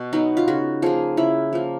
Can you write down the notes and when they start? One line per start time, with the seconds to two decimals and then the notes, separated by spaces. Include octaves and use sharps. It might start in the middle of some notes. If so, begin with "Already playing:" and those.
Already playing: B2
0.13 F#3 B3 D#4
0.37 F4
0.48 C#3 F#4
0.82 F3 A#3 G#4
1.17 C#3 E4
1.53 F3 A#3